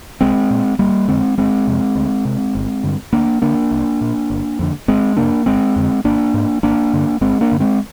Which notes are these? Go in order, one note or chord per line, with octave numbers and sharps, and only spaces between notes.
C2 G#3 C4
A#2
G1 G3 A#3
F2 D3 G#3 C4
G1 G#3 C4
F2 C3
D2
C3
G1
G2 D3
D2 A#3 D4
D3 A#3 D4
C2
A#2
G1
F2 D3
G1 G#3 C4
F2 C3 A#3 D4
G1 G#3 C4
F2 D3
G#1 A#3 D4
G#2
G#1 A#3 D4
G2 D3
G1 G#3 C4
A#3 D4
G2 D3
G#3 C4